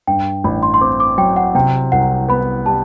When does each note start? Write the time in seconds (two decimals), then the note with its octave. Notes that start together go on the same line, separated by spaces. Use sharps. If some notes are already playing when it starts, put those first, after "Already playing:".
0.07 G2 G5
0.44 A1 B5
0.63 C6
0.74 C6
0.81 C4 D6
1.00 D6
1.18 F#3 G5
1.36 F#5
1.55 C3 G5
1.92 C2 F#5
2.28 B3 B5
2.66 G3 A5